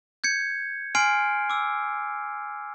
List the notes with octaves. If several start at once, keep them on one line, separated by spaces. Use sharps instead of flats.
G6 G#6 C#7
G#5 C6 F6 C7 D7
D6 E6